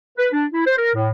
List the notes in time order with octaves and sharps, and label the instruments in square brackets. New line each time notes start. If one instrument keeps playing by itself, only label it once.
[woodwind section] B4
D4
E4
C5
A#4
A2